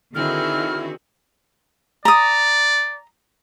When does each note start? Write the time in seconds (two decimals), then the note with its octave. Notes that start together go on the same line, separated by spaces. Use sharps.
0.15 D3 D#3 C4 E4 F#4 G#4 F6
2.05 D5 A#5 D#6